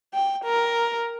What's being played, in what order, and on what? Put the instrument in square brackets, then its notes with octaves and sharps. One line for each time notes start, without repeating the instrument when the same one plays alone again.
[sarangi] G5
A#4